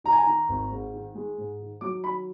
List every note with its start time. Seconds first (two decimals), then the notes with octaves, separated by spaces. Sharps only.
0.04 D#3 A#5
0.12 G#5
0.20 A#5
0.27 D#3
0.49 G#1
0.71 G#2
0.94 D#3
1.15 G#3
1.38 G#2
1.60 D#3
1.81 F#3 D6
2.03 D#3 B5